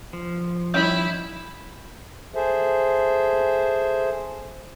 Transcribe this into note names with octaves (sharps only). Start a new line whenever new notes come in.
F3
D#3 G3 C#4 E4 G6
G#4 A4 C5 E5